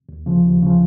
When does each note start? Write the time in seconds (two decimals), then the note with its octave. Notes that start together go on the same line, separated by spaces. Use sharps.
0.09 D#2
0.26 C#3 F3
0.45 D#2
0.62 C#3 F3